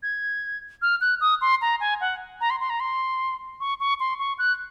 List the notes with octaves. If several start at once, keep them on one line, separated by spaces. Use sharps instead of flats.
G#6
F6
F#6
D#6
C6
A#5
G#5
F#5
A#5
C6
C6
A#5
C6
C#6
C#6
C6
C#6
F#6